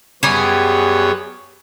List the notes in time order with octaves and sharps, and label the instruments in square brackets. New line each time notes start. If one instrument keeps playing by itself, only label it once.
[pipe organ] F#2 B3 C#5 [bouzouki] G3 G#4